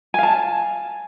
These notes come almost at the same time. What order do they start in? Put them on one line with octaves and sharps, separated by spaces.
G#5 F5 A5